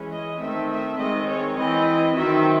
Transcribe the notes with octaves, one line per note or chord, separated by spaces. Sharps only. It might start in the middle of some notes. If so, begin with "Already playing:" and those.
Already playing: E3 G#3 C#4
D#5
D#3 A3 C4 E5
E5
D#3 G#3 C4 D#5
C#5
E3 C4 D#5
D#3 F#3 C4 E5